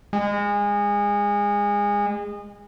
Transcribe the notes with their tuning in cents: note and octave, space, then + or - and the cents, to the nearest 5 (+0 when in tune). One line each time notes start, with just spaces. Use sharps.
G#3 -25